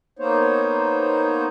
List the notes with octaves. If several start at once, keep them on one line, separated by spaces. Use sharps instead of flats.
A#3 B3 D#4 C5 C#5